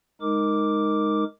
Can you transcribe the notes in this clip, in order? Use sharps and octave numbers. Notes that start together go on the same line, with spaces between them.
G#3 D#4 A#4 D6